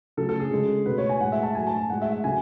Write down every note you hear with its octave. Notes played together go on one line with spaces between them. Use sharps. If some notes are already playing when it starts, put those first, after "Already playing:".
C#3 F#3 A3 A4
A4
G#4
C#3 G#3
B2 A3 B4
C#5
G#5
A2 G#3 F#5
E5
A5
A2 F#3 A3 G#5
A5
A5
A2 G#3 F#5
E5
F#5
C#3 F#3 A3 G#5